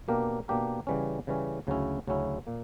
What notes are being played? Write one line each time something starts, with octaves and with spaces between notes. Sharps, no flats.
B2 A#3 D4 G4 A#4
B2 A#3 D4 G4 A#4
C#3 E3 G3 C#4
C#3 E3 G3 C#4
D2 C#3 F#3 C#4 E4
D2 C#3 F#3 C#4 E4
A#2 A#3